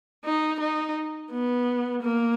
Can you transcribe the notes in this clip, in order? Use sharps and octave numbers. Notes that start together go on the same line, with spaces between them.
D#4
D#4
B3
A#3